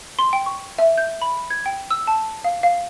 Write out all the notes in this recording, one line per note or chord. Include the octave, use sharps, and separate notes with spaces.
C6
G5
C#6
E5
G6
B5
G#6
G5
E6
A5
F5
F5